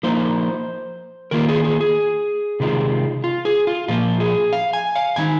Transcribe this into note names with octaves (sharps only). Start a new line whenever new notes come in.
F3 A#3 D#4 C5
D#3 A#3 F4 A#4
G#4
G#4
G#4
C3 D#3 G#3 C4 F4
F4
G#4
F4
A#2 F3 A#3 F4
G#4
F5
G#5
F5
D#3 A#3 D#4 G#5